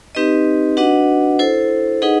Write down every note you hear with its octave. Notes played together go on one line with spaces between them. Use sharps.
C4 D#4 G4 B4 D#5
D4 F#4 B4 D#5 F#5
E4 A4 C5
D#4 G#4 B4 D#5 F#5